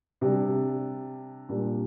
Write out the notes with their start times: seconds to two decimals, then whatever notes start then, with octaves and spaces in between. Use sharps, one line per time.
0.21 C3 G3 D4
1.49 A#2 G3 A#3 D4